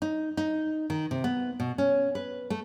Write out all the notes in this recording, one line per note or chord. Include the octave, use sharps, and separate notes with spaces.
D#4
D#4
D#3
C3
B3
B2
C#4
B4
A3